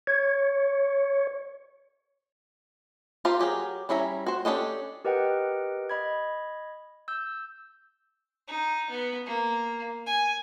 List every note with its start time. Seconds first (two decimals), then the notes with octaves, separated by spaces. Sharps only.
0.07 C#5
3.25 F4 G4 A#4 C5 F5
3.39 F#3 G4 G#4 A#4
3.89 G3 C#4 E4 E5 A#5
4.26 F#4 C5
4.45 C#4 D4 G4 A4 D#5
5.05 G4 A#4 B4 D#5 F#5 G5
5.90 D#5 B5 G#6
7.08 E6 G6
8.49 D#4
8.90 B3
9.26 A#3
10.07 G#5